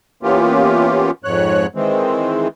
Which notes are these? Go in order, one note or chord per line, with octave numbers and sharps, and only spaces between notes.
E3 A#3 B3 C#4 F4 G4
F2 G#2 C#5 F#6
D#3 E3 G#3 C4